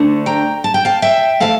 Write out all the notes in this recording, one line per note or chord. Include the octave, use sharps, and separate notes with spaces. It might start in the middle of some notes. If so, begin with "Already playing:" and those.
Already playing: D2 D3 A3
G5 A#5
A5
G5
F5 A5
E5 G5
E3 A3 F5 A5